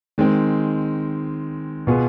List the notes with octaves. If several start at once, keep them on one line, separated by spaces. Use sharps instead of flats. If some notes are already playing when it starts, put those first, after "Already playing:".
D#3 G#3 C4
B2 B3 F4 G#4